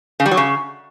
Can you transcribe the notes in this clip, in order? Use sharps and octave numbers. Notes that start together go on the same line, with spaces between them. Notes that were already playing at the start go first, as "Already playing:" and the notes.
C#3
G3
F#3
C#3